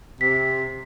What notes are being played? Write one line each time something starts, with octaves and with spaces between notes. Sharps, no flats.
C3 B6